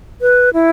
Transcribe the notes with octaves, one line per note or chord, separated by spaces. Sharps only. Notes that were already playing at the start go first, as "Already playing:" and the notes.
B4
E4